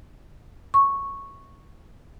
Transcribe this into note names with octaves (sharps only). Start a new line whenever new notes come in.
C#6